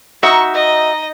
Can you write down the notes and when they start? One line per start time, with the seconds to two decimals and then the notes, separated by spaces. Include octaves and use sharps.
0.23 D#4 F#4 E5 C#6
0.54 D#5